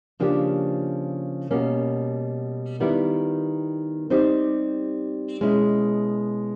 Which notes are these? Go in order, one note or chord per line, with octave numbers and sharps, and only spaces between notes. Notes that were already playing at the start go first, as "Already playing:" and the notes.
C#3 F3 A#3 D4 G4
B2 G3 A#3 C#4
D#3 G3 B3 E4
G3 C4 D#4 G4 C5
B2 G#3 C#4 E4